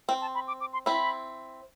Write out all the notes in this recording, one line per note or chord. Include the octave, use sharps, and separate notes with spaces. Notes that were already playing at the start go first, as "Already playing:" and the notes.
C4 G5
A5
B5
D6
D6
C6
C4 E4 B5